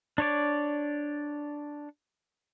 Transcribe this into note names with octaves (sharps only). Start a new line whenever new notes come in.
D4 C#5 D5